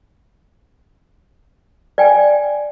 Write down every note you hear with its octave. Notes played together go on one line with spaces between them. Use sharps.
D5 G5 G#5